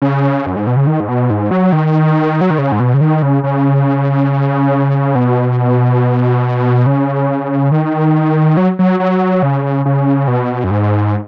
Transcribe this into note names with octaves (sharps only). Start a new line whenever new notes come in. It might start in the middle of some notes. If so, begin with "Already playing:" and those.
C#3
F#2
G#2
B2
C#3
D#3
G#2
B2
G#2
F#3
D#3
F#3
D#3
C#3
G#2
B2
C#3
D#3
C#3
C#3
B2
C#3
D#3
F#3
F#3
F#3
C#3
C#3
B2
F#2
G#2